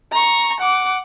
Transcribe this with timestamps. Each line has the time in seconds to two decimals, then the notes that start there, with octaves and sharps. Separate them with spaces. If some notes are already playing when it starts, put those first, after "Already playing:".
0.12 A#5 C#6
0.60 F#5 D6